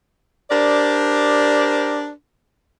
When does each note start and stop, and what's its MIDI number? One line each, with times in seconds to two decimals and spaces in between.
0.50 2.10 62
0.50 2.10 67
0.50 2.10 70
0.50 2.10 72
0.50 2.10 74